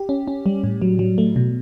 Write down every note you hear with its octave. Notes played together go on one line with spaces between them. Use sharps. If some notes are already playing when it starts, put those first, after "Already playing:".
Already playing: G4
C#4
C#4
G3
A2
F#3
F#3
A3
B2